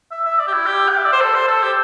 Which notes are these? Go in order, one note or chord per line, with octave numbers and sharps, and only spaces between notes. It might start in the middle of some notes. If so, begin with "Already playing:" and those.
E5
E5
D5
G4
E4
G4
G5
E5
D5
C5
A4
C5
A4
G4